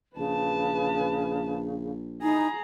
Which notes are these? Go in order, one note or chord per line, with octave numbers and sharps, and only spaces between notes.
A#1 C#3 B4 A5
D#4 E4 G#4 A#5